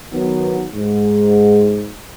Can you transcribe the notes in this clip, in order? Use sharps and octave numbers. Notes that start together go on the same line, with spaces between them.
D#3 F#3 B3
G#2